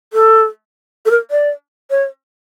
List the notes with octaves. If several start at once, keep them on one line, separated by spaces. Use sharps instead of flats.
A4
A4
A#4
D5
C#5